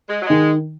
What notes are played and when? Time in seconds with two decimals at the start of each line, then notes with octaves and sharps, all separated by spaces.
0.09 G#3
0.22 F#3
0.27 D#3 G#3